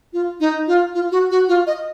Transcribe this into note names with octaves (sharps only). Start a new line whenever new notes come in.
F4
D#4
F4
F4
F#4
F#4
F4
D#5